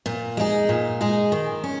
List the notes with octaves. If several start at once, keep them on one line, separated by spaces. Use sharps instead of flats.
A#2
G#3 D#4 G#4
A#2
G#3 D#4 G#4
D#3
C#4